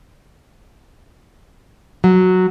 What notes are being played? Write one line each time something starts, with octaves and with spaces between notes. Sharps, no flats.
F#3